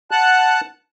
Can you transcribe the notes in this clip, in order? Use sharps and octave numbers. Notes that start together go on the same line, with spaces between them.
F#5 A5 F#6